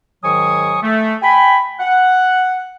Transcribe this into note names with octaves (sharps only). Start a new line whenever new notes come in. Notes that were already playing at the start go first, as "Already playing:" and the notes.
G#2 D#3 F#3 G#5 C#6 D#6
A3
G5 G#5 B5
F#5